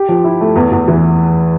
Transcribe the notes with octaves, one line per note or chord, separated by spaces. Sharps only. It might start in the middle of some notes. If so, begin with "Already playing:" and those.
Already playing: G4
F3
E4
A3
E2
E2
E3